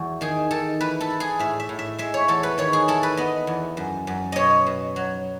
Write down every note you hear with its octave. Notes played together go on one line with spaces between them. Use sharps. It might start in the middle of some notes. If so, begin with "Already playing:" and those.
Already playing: E2 F#4
D#3 G#4
D#3 A4
E3 B4
A4
E4
G#4
A2 E5
E5
A2
E5
G#3 E5
C#5
E2 A4
B4
D#3 C#5
G#4
E4 A4
B4
B3 D#5
E2
F#2
F#2
B2 C#5 D#5
B2
F#3